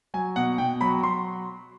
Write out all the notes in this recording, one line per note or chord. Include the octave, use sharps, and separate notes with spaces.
F#3 G#5
B2 F#5
B2 G5
F#3 B5
F#3 C6